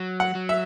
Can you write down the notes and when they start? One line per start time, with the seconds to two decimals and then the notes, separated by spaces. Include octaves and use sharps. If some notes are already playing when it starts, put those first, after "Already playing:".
Already playing: F#3
0.20 F#5
0.35 F#3
0.49 E5